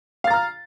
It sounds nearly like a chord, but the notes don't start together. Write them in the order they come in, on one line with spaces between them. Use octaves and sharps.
F5 A6 A#5 F6